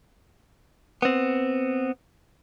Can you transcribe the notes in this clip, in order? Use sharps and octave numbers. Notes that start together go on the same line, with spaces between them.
B3 C4